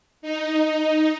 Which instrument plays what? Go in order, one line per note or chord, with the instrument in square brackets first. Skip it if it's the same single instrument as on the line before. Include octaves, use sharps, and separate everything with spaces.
[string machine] D#4